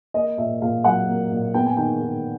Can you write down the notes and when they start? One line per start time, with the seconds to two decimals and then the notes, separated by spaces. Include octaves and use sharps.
0.14 A#3 D#5
0.38 A#2 E5
0.61 A#2 F5
0.84 F#3 F#5
1.07 A#3
1.31 A#2
1.54 B3 G5
1.66 G#5
1.77 D#3 G5
2.02 D#3